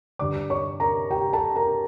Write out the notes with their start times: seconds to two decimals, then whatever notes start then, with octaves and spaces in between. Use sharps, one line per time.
0.19 G2 D3 D5 D6
0.50 C#5 C#6
0.80 A#4 A#5
1.10 G4 G5
1.33 A4 A5
1.56 A#4 A#5